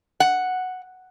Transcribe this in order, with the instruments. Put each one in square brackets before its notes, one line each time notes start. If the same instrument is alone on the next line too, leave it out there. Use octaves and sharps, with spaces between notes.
[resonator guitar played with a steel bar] F#5